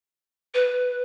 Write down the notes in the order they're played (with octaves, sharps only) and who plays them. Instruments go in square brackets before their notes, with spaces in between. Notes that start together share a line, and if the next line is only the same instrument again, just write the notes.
[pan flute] B4